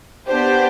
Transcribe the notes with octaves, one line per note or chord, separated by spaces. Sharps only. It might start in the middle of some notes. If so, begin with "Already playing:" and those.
B3 D4 G4 C5